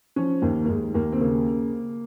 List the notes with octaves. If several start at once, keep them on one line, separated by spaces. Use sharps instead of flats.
F3 C#4
D#2 A#3
A#3
D#2 G#3
D#2 A#3
C4
C#3 A#3